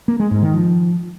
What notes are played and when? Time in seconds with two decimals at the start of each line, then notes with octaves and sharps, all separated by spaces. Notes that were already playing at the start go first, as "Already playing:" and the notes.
0.08 A#3
0.19 G#3
0.31 G#2
0.42 D#3
0.54 F3